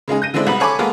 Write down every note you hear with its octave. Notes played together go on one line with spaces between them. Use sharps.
C#3 G#3 D#4 G#4
G6 A#6 D#7
D3 G#3 C4 D4 E4
C2 B3 B5 F#7
A4 C#5 G#5 B5 C#6 D6
G#3 A#3 B3 A4 A#4